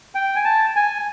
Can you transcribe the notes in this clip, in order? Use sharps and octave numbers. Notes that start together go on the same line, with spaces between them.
G5
G#5
A5
G#5